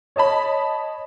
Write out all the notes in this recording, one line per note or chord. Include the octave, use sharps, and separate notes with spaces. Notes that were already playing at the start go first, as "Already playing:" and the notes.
C#5 D#5 A5 B5